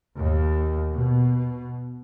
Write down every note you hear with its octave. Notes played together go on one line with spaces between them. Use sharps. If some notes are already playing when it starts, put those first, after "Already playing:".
D#2
B2